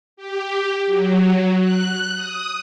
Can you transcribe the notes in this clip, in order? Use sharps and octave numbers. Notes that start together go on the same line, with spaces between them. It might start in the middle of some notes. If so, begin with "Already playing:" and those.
G4
F#3
F#6
D#6